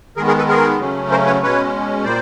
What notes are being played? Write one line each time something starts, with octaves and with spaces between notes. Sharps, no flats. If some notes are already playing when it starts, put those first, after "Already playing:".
D#3 G#3 B3 G#4 A#4
G#4 A#4
A4 B4
G#4 A#4
C#3 F#3 A3 C#4
A#4 C5
B4 C#5
B2 G#3 C#4 B4 C#5
A#2 G3 A#3 C5 D5